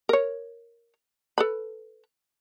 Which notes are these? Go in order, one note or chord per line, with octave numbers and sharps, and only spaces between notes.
A#4 C#5
A4 B4 B5